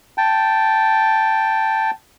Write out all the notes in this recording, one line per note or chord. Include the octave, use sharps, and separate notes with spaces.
G5 A5